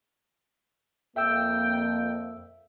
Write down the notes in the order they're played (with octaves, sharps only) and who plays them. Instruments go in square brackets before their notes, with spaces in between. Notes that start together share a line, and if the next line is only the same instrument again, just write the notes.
[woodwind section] F2 [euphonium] A#3 [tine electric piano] E5 E6 [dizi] G5